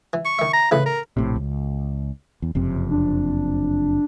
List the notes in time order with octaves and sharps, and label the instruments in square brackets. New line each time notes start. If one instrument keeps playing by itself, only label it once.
[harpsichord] E3
[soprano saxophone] C#6
[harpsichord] D#3 E5
[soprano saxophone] A#5
[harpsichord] A2 C#3 E3 [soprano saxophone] B4
[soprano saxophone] A#4
[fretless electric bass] A#1 A2 C3
C#2
E2
F#1 F2 C3
[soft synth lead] D4